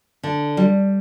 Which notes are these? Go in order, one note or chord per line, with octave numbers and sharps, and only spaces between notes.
D3
G3